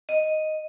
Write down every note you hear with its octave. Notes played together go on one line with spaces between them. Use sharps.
D#5